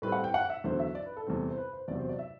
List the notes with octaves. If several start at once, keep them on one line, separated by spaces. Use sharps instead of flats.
A2 G3 C4 B4
F#5
G5
F#5
E5
E2 D3 F#3 C5
E5
D5
B4
A4
E2 C3 G3 C4
C5
B4
C5
E2 C3 F#3 D5
C5
D5
E5